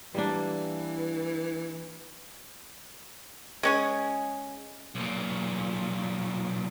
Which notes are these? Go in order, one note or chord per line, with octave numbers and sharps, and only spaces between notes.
E3 G3 A#3 D4
G#3 C#4 G#4
B1 A#2